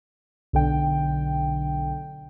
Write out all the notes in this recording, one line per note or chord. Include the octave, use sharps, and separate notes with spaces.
B1 D3 G5